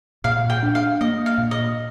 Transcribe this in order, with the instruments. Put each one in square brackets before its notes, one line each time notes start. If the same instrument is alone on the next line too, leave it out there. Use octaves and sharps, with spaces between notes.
[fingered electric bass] A#2 [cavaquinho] F5
[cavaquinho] G5
[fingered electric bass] D4
[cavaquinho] F5
[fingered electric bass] A#3 [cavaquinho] D#5
[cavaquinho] F5
[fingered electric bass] A#2
[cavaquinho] D#5